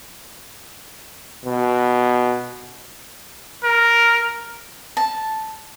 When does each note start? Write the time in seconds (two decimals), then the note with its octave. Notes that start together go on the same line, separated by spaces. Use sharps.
1.45 B2
3.65 A#4
4.97 A5